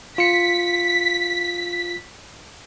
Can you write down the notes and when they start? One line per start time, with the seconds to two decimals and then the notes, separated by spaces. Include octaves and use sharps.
0.18 F4 B6 C#7